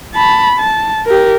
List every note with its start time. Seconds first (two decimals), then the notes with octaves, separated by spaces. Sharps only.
0.14 A5 B5
0.59 A5
1.07 G4 A#4